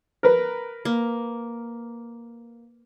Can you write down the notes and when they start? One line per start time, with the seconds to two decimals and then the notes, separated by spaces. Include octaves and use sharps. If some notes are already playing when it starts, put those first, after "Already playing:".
0.23 A#4 B4
0.85 A#3